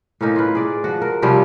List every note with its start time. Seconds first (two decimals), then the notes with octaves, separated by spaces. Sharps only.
0.21 A2 A#3 C#4 D#4
0.36 F4 B4
0.55 G#4 D5
0.84 F3 F#4
1.02 A#4
1.22 C3 F3 G3 C#4